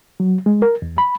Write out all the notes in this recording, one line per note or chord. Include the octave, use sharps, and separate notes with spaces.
F#3
G#3
A#4
E2
B5